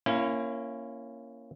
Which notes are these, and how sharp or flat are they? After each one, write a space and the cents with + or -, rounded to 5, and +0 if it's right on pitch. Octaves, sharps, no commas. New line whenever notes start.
A#3 +0 C#4 -10 E4 +30